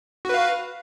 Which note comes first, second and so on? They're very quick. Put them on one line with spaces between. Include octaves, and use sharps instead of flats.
F#4 B4 F5